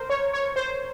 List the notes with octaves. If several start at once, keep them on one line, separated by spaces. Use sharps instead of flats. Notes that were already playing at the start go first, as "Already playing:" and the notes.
Already playing: A#4 C5
C#5
C#5
C5